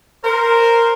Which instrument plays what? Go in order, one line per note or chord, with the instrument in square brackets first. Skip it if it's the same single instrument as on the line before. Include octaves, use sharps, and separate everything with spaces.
[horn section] A#4 C5